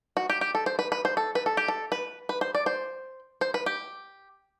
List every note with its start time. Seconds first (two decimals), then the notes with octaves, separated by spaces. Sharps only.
0.17 F#4
0.30 G4
0.41 G4
0.55 A4
0.66 C5
0.79 B4
0.92 B4
1.05 C5
1.17 A4
1.35 B4
1.46 A4
1.57 G4
1.68 A4
1.92 B4
2.29 B4
2.41 C5
2.55 D5
2.66 C5
3.41 C5
3.54 B4
3.66 G4